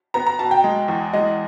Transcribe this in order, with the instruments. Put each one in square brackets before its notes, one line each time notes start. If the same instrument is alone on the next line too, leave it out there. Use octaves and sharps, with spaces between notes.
[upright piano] B3 A#5
A#5
B2 A5
G5
G#3
E2
G#3 D#5